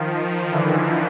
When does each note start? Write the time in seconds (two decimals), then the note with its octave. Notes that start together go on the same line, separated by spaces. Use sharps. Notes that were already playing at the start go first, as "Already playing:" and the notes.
Already playing: D#3 F3
0.52 D3 E3